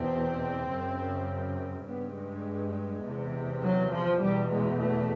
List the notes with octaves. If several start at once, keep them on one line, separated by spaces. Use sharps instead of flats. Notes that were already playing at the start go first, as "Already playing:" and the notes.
Already playing: E2 B2 C4
F#2 C#3
G2 B3
G#3
E2 C3
F#3
F3
E2 B2 G3
G#3
A3